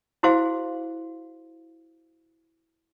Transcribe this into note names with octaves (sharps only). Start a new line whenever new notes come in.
E4 F#4 G#4 C5 F5